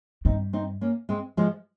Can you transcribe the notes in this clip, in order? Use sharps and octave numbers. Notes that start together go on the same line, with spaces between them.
G2 C4 D#4
C4 D#4
A#3 C#4
G#3 C4
F3 G#3